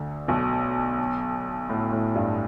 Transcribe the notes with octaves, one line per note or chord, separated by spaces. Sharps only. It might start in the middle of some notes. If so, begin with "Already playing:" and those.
Already playing: D2 D3
B1 B2
A2
A2
G2